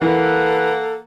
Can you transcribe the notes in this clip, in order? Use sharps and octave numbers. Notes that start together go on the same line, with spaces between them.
E3 A#3 A4 B4 F#5